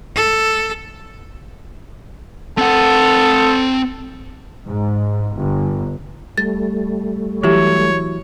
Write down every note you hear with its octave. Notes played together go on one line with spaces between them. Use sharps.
A4
C4 A4 F#5
G#2
G1
G3 A3 A6
E3 F#3 E4 G4 C#5